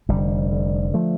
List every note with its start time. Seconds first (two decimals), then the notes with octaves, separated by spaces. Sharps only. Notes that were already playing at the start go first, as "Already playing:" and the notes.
0.09 F1 D3 G3
0.51 D3
0.94 F3 A3